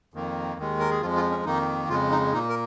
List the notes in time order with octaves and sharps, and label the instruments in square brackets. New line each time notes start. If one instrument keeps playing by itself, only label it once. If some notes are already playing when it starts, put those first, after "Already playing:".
[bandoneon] F2 D#3 A#3
D#2 D#3 G#3
A#4
G#4
F2 F3 G#3 F4
F4
C#4
F2 D#3 A#3 D#4
F2 C#3 G#3 F4
D#4
A#2 A#3 D#4
A#4